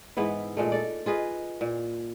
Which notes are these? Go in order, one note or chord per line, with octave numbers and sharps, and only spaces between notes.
G#2 E3 B3 E4
A#2 G#3 A3
A4 D5
F4 G#4 B4 D#5
A#2